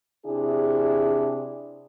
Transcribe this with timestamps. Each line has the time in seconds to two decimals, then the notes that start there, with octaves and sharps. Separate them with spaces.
0.25 C3 D4 E4 G#4